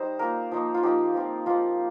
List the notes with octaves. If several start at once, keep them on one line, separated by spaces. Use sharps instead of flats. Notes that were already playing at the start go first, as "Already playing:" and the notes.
Already playing: G3 D#4 C5
A#3 F4 A#4
F3 A#3 D#4
F4
F3 A#3 D#4 G4
F3 C4 F4
F3 A#3 D#4 F4